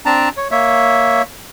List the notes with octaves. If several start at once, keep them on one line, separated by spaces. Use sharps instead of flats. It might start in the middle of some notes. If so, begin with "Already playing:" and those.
C4 D4 A5 A#5
C#5
A#3 C#5 E5